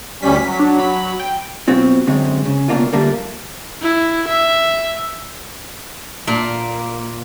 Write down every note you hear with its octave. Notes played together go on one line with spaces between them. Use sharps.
D2 G3 C#4 B6
F#3
D4
B5
G5
B2 F#3 C4 F4
F#2 D3 G#3 C4 C#4
C#3
C#2 G2 B2 A#3 D4 F4
D3 F3 G3 A3 A#3 D4
E4
E5
A#2 A#3